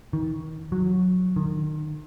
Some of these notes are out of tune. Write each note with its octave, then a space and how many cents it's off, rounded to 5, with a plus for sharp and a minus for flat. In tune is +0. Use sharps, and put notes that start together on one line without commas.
D#3 +30
F#3 -15
D#3 -30